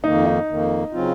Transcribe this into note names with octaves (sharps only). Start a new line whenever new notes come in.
F2 D#3 A#3 D#4
D#4
F2 D#3 A#3
C#3 F#3 C4 F4